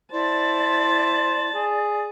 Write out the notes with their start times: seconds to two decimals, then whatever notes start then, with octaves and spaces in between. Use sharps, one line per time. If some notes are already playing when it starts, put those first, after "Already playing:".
0.12 E4 C5 D5 A5
1.55 G#4